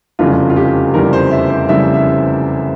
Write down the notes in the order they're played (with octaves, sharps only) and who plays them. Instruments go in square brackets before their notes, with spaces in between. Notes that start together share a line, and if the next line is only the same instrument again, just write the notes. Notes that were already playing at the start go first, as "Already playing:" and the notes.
[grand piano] F1 E2 C#3 G3 F4
F4
G4
F1 E2 C#3 G3 A#4
C5
E5
C5
F1 E2 C#3 G3 E5
E5